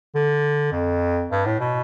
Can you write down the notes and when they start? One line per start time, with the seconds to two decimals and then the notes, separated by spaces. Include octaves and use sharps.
0.15 D3
0.72 F2
1.31 G2
1.46 A2
1.60 B2